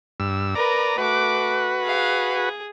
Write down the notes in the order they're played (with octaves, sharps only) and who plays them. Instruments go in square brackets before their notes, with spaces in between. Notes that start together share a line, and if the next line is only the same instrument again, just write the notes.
[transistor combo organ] G2 E6
[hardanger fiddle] A#4 B4 [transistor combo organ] D5 A#5
[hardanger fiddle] A3 D6 [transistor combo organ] F#4 B4
[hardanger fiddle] G#4 F5
G#4